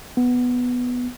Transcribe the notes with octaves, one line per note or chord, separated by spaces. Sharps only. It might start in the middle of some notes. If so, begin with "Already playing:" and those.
B3